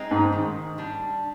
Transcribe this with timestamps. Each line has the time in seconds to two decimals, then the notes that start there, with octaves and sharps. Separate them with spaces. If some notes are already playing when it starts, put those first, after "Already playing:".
Already playing: G#3 C4 D#4
0.11 G#2
0.33 D#3
0.78 G3 D4